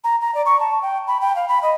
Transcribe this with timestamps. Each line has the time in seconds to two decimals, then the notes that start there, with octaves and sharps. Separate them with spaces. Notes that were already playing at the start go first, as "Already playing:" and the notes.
0.04 A#5
0.21 A#5
0.35 D5
0.46 C#6
0.60 A5
0.82 G5
1.07 B5
1.21 G5
1.36 F5
1.48 B5
1.62 D#5